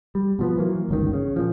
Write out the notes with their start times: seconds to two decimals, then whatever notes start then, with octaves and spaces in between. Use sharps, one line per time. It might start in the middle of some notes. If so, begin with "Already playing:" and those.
0.15 G3
0.39 B2 F3 B3
0.58 E3 F#3 A#3
0.89 G1 C#2 D#3
1.14 C#3
1.36 A#2 F3